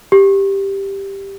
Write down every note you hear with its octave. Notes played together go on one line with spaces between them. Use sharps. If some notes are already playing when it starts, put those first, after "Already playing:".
G4